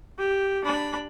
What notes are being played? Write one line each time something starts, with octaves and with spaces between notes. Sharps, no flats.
G4
D4 B5